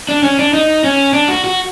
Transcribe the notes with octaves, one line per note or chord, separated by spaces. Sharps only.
D4
C#4
D4
D#4
C#4
D4
F#4
F#4